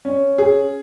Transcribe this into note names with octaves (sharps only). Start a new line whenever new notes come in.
C#4
G#4